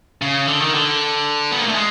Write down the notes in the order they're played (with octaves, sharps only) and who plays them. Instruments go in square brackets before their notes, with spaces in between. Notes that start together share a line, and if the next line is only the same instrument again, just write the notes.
[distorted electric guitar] C#3
D3
D#3
D3
B3
A#3
A3
G#3